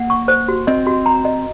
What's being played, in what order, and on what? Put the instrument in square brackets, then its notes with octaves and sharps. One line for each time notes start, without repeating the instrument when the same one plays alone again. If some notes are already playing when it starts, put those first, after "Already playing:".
Already playing: [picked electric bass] A#3 [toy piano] F#5
[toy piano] C#6
C5
F#4
[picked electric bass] C4 [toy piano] D#5
[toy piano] F#4
A#5
D#5